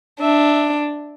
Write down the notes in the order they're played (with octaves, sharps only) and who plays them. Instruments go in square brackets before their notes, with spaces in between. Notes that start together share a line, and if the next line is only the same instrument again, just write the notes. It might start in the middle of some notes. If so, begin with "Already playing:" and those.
[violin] D4 [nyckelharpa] E5